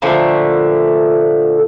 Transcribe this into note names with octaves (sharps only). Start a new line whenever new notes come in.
A#2 D3 F3 A3